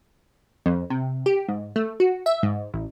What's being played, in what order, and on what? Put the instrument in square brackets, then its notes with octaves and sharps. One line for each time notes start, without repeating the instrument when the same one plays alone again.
[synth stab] F2
C3
G4
G#2
A3
F#4
E5
G#2
A1